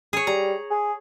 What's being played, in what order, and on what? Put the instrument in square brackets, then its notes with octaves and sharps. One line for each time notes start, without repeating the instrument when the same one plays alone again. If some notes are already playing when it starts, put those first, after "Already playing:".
[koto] G#4 C#5
[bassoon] G3 [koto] A#5
[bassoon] G#4